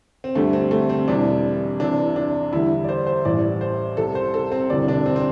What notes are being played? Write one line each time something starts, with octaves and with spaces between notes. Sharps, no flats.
C4
D2 D3 G3 A3
C4
A3
C4
E1 E2 E3 G3 D4
E2 C3 E3 D4
D4
E2 D3 G3 E4
D5
C5
C5
A1 A2 E3 G3 D5
C5
C2 C3 G3 A4
C5
A4
C4
E1 D2 C3 E3 G3 D5
D4
C4
C4